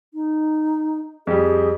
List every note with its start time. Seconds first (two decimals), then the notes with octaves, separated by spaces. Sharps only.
0.14 D#4
1.27 F2 G3 G#4